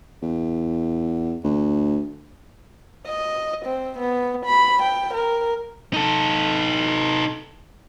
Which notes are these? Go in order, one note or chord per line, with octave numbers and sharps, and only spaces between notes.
E2
D2
D#5
C4
B3
B5
G5
A#4
D#4 A4